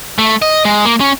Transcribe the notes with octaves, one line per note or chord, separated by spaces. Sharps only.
A3
D#5
G#3
A#3
C#4